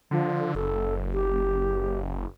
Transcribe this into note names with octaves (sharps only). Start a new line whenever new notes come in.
D3 F3
F#1 A4
G4